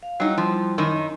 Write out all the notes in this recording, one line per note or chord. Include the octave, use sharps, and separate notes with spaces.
F5
F#3 G3 D#4 E4
F3
F#2 D#3 D#4